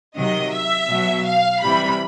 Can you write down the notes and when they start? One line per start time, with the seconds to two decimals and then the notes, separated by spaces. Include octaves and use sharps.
0.15 C3 D#3 F#3 D#5
0.52 E5
0.89 B2 F#3
1.26 F5
1.62 C3 E3 G3 B5